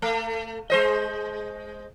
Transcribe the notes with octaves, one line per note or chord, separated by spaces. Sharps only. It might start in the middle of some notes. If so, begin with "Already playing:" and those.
A3
G#3 C5 D#5